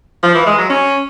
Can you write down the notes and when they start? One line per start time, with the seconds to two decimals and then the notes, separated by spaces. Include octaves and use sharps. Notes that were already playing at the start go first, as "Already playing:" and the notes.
0.23 F3
0.35 E3
0.46 G#3
0.58 F#3
0.70 C#4